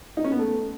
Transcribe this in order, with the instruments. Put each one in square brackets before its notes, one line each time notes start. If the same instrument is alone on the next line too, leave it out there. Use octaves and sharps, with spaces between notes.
[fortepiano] D#4
C#4
B3
A3